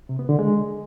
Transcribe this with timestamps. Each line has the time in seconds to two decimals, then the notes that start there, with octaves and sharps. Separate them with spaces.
0.09 C3
0.19 B3
0.29 D3
0.39 G#3